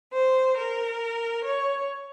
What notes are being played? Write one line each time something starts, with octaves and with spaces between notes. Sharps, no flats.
C5
A#4
C#5